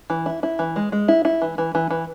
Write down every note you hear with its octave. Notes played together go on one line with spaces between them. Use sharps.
E3
E4
E4
E3
G#3
G#3
E4
E4
E3
E3
E3
E3